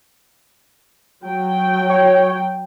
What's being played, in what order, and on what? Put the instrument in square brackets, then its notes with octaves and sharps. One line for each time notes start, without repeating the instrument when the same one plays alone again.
[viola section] F#3 G5
[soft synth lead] C#5